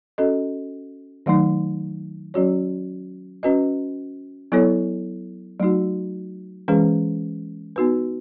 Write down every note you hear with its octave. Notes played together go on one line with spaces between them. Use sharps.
C#4 F#4 A4 D#5
D#3 F#3 A3 D#4
F#3 C#4 F#4 C#5
C#4 F#4 B4 D#5
F#3 B3 E4 A4 C#5
F#3 A3 D#4 F#4
E3 G#3 C#4 G#4 B4
B3 D#4 F#4 B4